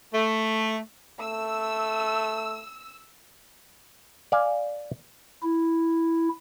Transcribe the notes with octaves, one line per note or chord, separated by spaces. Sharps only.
A3
A3 E6
D5 F5 G#5
E4